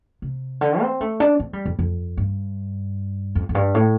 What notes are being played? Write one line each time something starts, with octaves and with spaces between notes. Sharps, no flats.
C3
D3
C4
A3
D4
C4
G3
F2
F2
G2
F2
F2
G2
A2